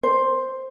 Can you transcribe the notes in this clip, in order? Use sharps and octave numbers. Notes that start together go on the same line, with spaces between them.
C5